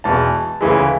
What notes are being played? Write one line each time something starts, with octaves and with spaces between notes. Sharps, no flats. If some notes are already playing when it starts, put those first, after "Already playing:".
E2 B2 G#3 A5
D2 C#3 E3 G#3